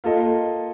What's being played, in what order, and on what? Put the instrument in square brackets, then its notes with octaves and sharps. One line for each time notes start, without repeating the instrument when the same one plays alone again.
[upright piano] A#3 F4 A4 D#5